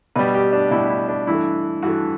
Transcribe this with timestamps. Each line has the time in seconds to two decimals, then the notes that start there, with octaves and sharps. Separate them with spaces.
0.16 B2 G3 B4
0.34 G4
0.53 D4
0.71 B2 G3 E4
0.89 E4
1.08 D4
1.27 G2 E3 A3 E4
1.83 G2 E3 A3 F#4